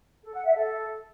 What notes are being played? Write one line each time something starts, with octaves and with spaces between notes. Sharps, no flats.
A4
F#5
E5
A4